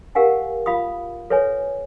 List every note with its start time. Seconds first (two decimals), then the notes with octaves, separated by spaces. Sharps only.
0.15 G4 A#4 F5 F#5 G#5
0.66 F4 F5 B5 D#6
1.30 A4 B4 C#5 E5 G#5